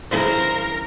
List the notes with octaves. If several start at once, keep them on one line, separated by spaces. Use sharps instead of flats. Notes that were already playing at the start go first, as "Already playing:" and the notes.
G2 C#3 E3 A#4 C5